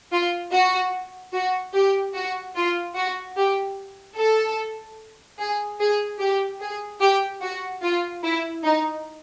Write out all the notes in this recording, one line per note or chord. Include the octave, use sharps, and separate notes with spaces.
F4
F#4
F#4
G4
F#4
F4
F#4
G4
A4
G#4
G#4
G4
G#4
G4
F#4
F4
E4
D#4